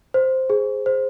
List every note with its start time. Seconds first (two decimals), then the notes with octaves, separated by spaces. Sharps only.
0.14 C5
0.50 G#4
0.86 C5